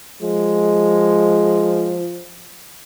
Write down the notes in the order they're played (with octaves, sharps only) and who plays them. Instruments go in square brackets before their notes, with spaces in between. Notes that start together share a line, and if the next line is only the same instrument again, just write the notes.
[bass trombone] F3 [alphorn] G#3